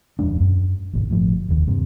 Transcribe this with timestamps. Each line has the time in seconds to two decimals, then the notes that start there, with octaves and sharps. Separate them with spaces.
0.19 D#1 F2 G#3 D4
0.40 F#2
0.93 D#1 G#1 B2
1.09 G1 A2 F3
1.48 F1 D#2
1.67 G2 C3